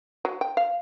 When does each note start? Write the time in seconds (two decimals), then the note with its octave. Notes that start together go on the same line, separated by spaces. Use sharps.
0.25 F#3
0.41 G5
0.57 F5